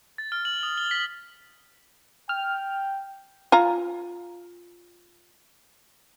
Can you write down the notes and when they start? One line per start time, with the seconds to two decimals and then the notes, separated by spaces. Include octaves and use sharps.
0.18 A6
0.32 F6
0.45 F#7
0.63 D#6
0.78 G7
0.91 B6
2.29 G5 F6
3.52 F4 G#5 A#5